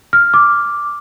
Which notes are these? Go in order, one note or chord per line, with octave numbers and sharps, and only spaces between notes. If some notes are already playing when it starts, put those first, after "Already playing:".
F6
D6